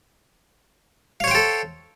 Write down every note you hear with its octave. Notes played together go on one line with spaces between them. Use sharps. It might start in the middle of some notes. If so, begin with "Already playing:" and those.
A4 C5 C#5 F5 G5